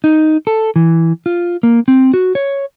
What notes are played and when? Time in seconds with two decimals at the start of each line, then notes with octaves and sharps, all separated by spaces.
0.04 D#4
0.47 A4
0.76 E3
1.26 F4
1.63 A#3
1.88 C4
2.14 F#4
2.35 C#5